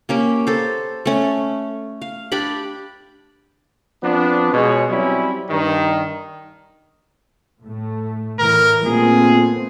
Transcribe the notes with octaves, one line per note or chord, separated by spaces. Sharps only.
A#3 C#4 G4
A4 C5
A3 C#4
F5
D4 G4 D5 B5
F3 B3 C4 D4
B2 G#3 G#4 C#5
F#3 G3 C4 C#4 E4
G2 D#3
A2 A3
A2 E3 A#4
A#2 A3 B3 C4 G#4